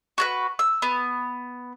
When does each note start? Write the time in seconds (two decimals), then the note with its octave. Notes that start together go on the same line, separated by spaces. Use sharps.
0.18 F#4 G#4 B4
0.59 E6
0.82 B3